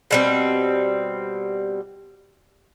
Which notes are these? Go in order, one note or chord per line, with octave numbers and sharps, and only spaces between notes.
B2 G3 C4